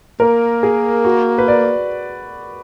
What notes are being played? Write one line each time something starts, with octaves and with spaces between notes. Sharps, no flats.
A#3 A#4
G#4
F#4
B4
D5